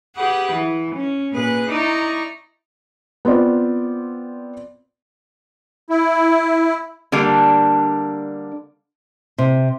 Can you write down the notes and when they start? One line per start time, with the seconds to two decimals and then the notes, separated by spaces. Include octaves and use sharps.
0.15 G4 G#4 B4 F#5
0.50 E3
0.94 C#4
1.32 A#2 G#4 B4 F#6
1.68 D#4 E4 D5 A#5 C#6
3.25 B3 C4 F4 D5
5.90 E4
7.12 D3 G3 A#3 D4
9.38 C3